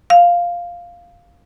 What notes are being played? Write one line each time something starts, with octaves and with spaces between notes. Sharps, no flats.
F5